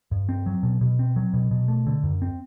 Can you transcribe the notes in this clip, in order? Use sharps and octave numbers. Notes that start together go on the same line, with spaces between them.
G2
C4
F#3
B2
B2
C4
F#3
B2
B2
A3
D3
F#2
C4